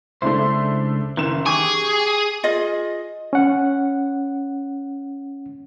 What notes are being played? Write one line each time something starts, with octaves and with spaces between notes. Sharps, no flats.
C#2 A3 D4 E4 C5
F#1 D#3 E3 E7
G4 G#4 C#6
F4 G#4 D#5
C#4 F#5